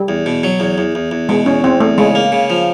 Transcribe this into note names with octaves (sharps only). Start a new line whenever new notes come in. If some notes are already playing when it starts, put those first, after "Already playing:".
Already playing: G3
E2
B2
F#3
E2
E2
E2
E2
B2 G#3
E2 C#4
E2 C4
E2 A3
C#3 G#3
A#3
C#3
F3